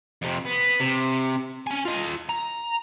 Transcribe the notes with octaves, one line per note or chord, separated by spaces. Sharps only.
F2 C3
B3
C3
C#4 G#5
F4 D#5
A#5